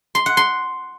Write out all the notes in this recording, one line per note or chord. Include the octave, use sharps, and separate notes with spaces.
C6
F#5
C6